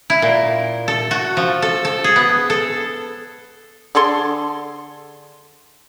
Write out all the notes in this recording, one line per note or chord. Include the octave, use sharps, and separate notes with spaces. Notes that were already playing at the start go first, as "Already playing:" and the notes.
E4
A#2
A4
F#4
F3
A4
A4
G#4
B3
A4
D3 G#4 A4 C6